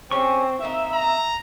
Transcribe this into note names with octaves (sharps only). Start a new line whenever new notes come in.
G#3 C4 C#4 G4 C#6
A#3 C4 D#4 E5
A#5